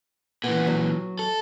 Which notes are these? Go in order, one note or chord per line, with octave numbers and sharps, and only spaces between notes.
A#2 E3 B3
F#3
A4